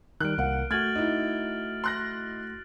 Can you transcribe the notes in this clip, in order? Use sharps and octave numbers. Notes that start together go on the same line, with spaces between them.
D#3 G3 F6 F#6 D7
C2 A#3 F#5 D7
A3 F#4 F6 G#6 A6 F#7
D#4 E4
C6 F#6 A#6